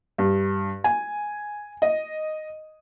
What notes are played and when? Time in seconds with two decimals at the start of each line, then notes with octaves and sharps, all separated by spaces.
0.18 G2
0.84 G#5
1.82 D#5